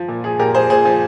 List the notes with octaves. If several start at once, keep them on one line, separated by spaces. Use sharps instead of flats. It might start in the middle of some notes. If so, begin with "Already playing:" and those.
Already playing: F3
A#2
F3 G#4
A#2 G4 A#4
F3 G#4 C5
A#2 G#4 C5
F3